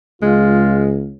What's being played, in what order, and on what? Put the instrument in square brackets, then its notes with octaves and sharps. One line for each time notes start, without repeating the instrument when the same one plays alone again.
[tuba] C#2 [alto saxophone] G#3 [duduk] F4